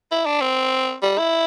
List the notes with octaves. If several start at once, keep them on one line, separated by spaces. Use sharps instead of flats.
E4
D4
C4
G3
E4